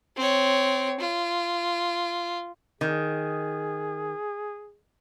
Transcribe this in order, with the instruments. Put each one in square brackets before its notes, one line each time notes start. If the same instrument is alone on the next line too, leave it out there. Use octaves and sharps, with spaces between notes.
[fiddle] C4 C#5
F4
[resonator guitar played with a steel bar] D#3 [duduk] G#4